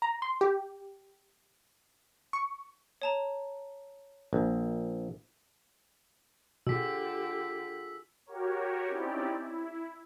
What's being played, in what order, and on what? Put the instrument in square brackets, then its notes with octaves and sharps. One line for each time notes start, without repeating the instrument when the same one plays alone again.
[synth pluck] A#5
C6
G4
C#6
[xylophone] C#5 A5 A#5
[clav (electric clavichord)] A#1
[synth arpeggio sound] B2 [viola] D3 G4 [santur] F4 G#4 [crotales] E6 B6
[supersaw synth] F#4 G4 A#4 C#5
C4 C#4 D#4 E4 G4 D5
E4